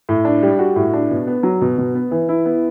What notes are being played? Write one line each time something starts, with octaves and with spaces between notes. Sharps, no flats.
A2
D4
G3
F#4
A2
D4
B2
B3
F#3
B2
B2
B3
E3
E4
B3